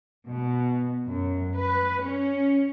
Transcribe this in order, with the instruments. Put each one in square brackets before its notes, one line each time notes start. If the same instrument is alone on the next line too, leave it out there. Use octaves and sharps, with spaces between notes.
[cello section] B2
F#2
B4
C#4